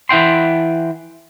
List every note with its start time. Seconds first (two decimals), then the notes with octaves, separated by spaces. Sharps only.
0.09 E3 E4 F#5 G5 C6